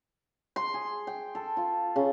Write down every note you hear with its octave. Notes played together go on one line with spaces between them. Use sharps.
C6
G#4
G5
A4
F4
C#3